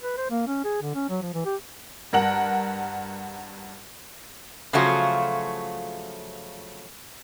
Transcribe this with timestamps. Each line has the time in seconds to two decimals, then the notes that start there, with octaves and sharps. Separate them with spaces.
0.01 B4
0.18 C5
0.30 A#3
0.47 C#4
0.64 G#4
0.82 D3
0.95 C#4
1.10 F#3
1.22 F3
1.34 E3
1.45 G4
2.13 G2 A#4 F#5 F#7
4.73 C#3 F3 F#3 A3 F4 F#4